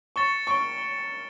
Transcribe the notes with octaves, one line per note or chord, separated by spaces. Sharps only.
C#6 A6 C#7 E7 G7
C#6 A6 D7 G7
G7